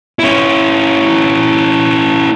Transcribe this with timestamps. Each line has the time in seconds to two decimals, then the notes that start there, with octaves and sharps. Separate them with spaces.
0.19 C#4 E4